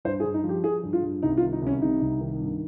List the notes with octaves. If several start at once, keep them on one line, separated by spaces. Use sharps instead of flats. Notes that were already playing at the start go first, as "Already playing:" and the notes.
G2 C5
G#4
G2
D#4
F3
G4
F3 G#4
G2
F4
G2
C2 D#4
F4
D#3
D#4
C2 C#4
C3 D#4
C2
D#3
G2